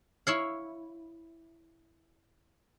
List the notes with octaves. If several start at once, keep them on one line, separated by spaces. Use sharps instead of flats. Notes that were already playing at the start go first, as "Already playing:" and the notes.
E4 C#5 F5